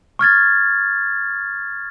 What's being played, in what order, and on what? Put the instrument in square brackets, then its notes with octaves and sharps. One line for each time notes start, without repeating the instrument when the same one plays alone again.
[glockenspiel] C#6 F6 G#6 A6